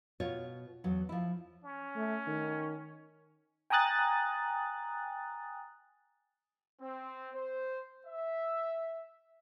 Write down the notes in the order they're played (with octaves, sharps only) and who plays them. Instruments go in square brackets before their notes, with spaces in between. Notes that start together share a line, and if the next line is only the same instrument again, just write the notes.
[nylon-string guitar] B2 F4 C#5
E2 F#3
F3 E4
[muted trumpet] C#4
[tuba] A3
D#3
[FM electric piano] G5 G#5 A#5 D#6 F#6 A6
[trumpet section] C4
C5
E5